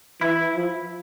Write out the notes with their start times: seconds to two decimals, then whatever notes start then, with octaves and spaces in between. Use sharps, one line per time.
0.21 E3 E4
0.56 F3